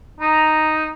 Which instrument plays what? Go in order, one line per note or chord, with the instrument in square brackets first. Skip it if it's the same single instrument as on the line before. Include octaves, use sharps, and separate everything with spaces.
[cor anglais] D#4 [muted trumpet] A#5